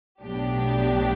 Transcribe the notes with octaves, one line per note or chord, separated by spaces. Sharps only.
B1 A2 F#3 B3 D4 G4